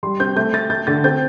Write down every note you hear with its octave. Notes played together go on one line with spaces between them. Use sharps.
G3 C6
C4 G6
A3 G6
A3 A6
A3 G6
D3 A6
C4 G6